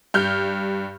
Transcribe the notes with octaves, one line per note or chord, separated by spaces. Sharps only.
G2 F6 G6